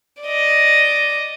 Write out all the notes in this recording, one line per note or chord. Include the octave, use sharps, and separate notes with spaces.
D5 D#5